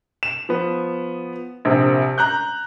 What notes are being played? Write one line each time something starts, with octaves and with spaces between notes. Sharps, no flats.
E7
F3 B3
A#1 C3
A#5 F#6 G6